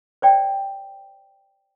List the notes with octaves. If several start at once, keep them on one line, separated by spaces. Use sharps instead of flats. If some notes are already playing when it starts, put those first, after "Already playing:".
C5 D5 G5